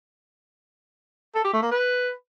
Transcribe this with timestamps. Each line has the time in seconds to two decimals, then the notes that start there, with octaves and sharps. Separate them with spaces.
1.35 A4
1.44 G4
1.53 A3
1.62 A#3
1.71 B4